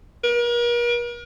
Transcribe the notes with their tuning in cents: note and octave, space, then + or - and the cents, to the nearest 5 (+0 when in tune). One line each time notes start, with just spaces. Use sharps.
A#4 +40